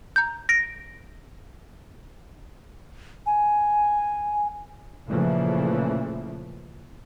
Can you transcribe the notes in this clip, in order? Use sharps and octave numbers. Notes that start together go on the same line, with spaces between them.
A#5 G6
A#6 D7
G#5
A#2 C#3 E3 F3 A3